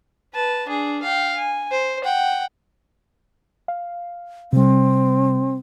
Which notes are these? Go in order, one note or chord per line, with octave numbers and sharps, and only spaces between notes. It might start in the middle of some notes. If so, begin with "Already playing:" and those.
B4 A5
D4 G#4
F5 G5
G#5
C5
F#5 G5
F5
C3 G3 C4